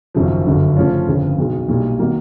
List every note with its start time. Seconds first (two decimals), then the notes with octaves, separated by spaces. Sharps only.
0.14 G#1 F#2 C#3 F3
0.46 G1 F#2 D3
0.76 C#3 F3 A3 C#4 F4
1.07 G1 F2 C#3 F3
1.38 B1 B2 G#3
1.68 B1 A#2 G3
1.99 D#3 F#3 A#3